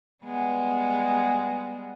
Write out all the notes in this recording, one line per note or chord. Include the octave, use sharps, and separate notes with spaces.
G3 G#3 B3